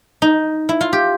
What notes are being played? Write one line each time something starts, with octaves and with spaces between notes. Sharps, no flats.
D#4
E4
F4
G4